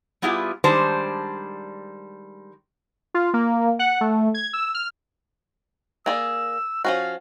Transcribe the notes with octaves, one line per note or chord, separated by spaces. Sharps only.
G3 B3 E4 F4 G4 G#4
D#3 G3 G#3 D4 C5 A5
F4
A#3
F#5
A3
G#6
E6
F6
A#3 G#4 D5 E6
F3 C#4 F#4 F5